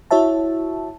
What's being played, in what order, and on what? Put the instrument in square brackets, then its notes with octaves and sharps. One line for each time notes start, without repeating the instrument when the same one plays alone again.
[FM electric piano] E4 F#4 C#5 E5 A5